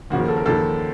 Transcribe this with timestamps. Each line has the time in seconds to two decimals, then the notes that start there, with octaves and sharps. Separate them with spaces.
0.10 D#2 C#3 F3 F#4
0.20 A#4
0.28 A4
0.37 A#4
0.46 D#2 C#3 F3 A4